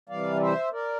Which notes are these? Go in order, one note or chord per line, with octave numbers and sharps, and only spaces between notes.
C3 E3 G3 D5 F5
D5
C5 E5
A#4 D5